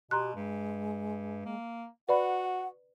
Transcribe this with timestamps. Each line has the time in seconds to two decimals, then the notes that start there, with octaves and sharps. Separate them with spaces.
0.11 B2 G4 A#5 C6 F#6
0.36 G2 G#3
1.45 A#3
2.09 F#4 B4 D5 F#5 B5